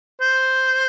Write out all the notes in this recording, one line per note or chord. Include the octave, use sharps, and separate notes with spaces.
C5